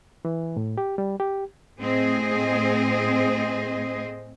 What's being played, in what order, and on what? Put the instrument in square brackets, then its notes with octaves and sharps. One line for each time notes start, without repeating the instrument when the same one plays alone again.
[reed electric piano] E3
A2
G4
G3
G4
[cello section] A2 C4 G#4 C5 D#5